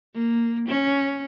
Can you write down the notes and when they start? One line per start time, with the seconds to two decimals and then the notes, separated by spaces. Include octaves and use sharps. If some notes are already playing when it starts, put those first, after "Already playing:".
0.14 A#3
0.69 C#4